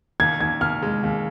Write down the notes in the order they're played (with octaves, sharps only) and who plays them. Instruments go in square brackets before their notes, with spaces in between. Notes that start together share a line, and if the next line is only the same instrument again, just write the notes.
[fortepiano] D#2 [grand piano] G#6
[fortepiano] D#2 [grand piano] G#6
[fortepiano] D#2 [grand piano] F6
[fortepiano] G#3
D#2